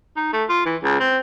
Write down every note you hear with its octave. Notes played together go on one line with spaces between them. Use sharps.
D#4
A3
F4
E3
C#2
C4